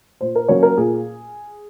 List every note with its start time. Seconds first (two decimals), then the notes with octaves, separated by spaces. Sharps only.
0.21 A#2 C5
0.35 A#4
0.49 F#3 A#3 C#4 C#5
0.63 A#4
0.77 A#2 G#4